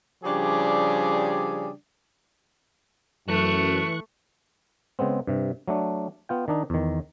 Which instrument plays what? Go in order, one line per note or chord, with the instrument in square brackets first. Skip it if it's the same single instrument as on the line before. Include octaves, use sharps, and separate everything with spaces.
[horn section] C#3 F3 G3 D4 G4 G#4
[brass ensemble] F#2 [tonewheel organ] E3 C#6 F#6 [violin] A3 [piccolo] C#7
[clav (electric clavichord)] C#3 G#3 B3 C4
G2 C3
F#3 A3 D4
B3 F4 G5
D#3 D4 D#4
E2 D#3